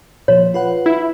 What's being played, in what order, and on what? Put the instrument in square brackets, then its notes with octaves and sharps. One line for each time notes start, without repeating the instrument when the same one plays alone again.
[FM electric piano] A#2 F3 [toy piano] C#5
[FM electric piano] F4 B4 F#5
[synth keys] E4